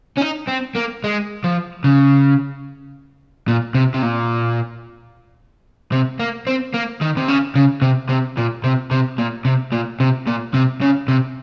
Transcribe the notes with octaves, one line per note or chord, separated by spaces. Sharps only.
C#4
D#4
C4
A#3
G#3
F3
C#3
A#2
C3
C3
A#2
C3
A#3
C4
A#3
D#3
C3
C#3
C#3
C3
C3
A#2
C3
C3
A#2
C3
A#2
C3
A#2
C3
C#3
C3